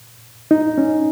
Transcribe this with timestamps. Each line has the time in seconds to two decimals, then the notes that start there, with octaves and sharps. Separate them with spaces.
0.51 D#4
0.78 C#4